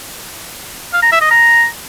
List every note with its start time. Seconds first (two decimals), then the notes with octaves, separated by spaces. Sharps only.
0.93 F5
1.02 A#5
1.12 E5
1.21 D#5
1.31 A#5